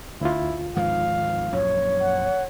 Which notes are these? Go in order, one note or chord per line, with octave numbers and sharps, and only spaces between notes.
D2 E4 F4
G#2 D#3 F3 F5
A#1 F#2 C#5
F#5